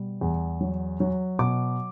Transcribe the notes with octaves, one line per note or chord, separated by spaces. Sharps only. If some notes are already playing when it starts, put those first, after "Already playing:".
Already playing: B2 G3
E2
F#3
F#3
B2 D6